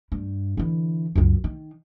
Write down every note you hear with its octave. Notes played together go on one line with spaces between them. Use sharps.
G2
D3 E3
C#2 F#2
D#3